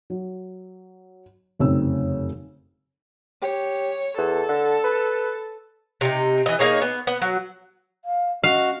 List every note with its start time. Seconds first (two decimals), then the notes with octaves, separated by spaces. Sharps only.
0.10 F#3
1.59 F1 F#2 C#3 C4 D#4 E6
3.43 G4 C#5
4.18 E2 A4
4.49 D3
4.84 B4
6.01 C3 D#4
6.46 E3 D#5
6.59 A#3 D#4 G#4 C#5
6.82 B3
7.07 B3
7.22 F#3
8.05 F5
8.43 C#4 F#4 D#5 F5